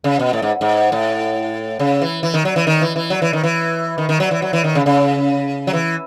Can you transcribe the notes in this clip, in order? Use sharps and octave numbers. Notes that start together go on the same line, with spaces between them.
C#3
B2
A2
G#2
G#2
A2
C#3
E3
E3
D#3
F#3
E3
D#3
E3
E3
F#3
E3
D#3
E3
D#3
D#3
F#3
E3
F#3
E3
D#3
C#3
C#3
F#3
E3